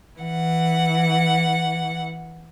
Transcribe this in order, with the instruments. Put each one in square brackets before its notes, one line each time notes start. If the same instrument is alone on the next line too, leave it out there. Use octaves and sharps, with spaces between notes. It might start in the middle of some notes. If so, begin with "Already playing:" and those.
[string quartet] E3 F#5